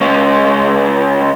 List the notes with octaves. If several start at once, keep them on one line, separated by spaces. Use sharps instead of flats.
C#2 C#4